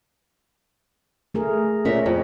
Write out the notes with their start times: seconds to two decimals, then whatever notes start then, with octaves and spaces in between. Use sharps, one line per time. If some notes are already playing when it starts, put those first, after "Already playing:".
1.34 A3 G#4 A#4
1.85 A#2 C#4 A#4 E5
2.06 F2 F4